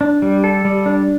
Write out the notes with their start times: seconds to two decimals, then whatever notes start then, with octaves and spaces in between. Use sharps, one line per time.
0.01 D4
0.22 G3
0.44 A4
0.65 G3
0.86 D4